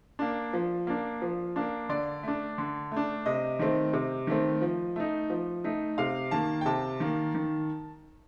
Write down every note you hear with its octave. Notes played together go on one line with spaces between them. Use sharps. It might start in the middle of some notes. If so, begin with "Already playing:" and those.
A#3 D4
F3
A#3 D4
F3
A#3 D4
D3 D5
A3 D4
D3
A3 D4
C3 D#5
D#3 A3 C4
C3
D#3 A3 C4
F3
A3 D#4
F3
A3 D#4
C3 F5
D#3 A#3 A5
G5
C3 A5
D#3 A#3
D#3